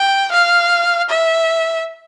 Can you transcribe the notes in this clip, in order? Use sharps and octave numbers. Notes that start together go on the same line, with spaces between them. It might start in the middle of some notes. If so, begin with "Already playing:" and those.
Already playing: G5
F5
E5